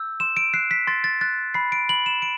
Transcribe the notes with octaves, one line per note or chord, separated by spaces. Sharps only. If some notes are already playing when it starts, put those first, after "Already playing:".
Already playing: E6 G6
C6 E7
D7
F#6 C7
B6
C6 A6
A6
F#6 A6
B5 C7
D7
B5 F#7
E7
D7